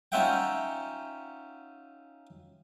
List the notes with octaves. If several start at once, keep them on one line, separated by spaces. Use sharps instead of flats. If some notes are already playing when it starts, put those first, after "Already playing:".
C#4 D#4 F4 E5 F#5 G5